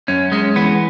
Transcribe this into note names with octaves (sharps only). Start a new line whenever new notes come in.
F#2 C#4
G#3 C#4
E3 B3